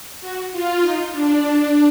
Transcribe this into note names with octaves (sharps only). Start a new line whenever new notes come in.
F#4
F4
D#4
D4